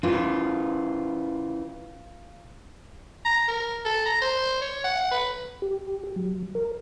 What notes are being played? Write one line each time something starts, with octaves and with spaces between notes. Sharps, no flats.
C#3 E3 F4
A#5
A#4
A4
A#5
C5
C#5
F#5
B4
G4
F#3
A#4